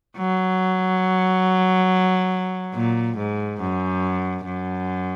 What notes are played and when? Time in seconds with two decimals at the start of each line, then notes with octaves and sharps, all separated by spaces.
0.18 F#3
2.74 A#2
3.17 G#2
3.61 F#2
4.45 F#2